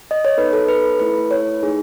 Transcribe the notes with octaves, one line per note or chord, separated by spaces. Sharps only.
D#5
C#5
B3 D#4 A4 B4
A4
B4
A4
A3 E4 A4 B4
C#5
A3 D#4 G#4